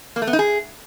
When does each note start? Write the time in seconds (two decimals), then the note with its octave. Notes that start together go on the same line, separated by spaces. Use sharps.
0.16 A#3
0.22 A3
0.27 B3
0.33 D#4
0.39 G#4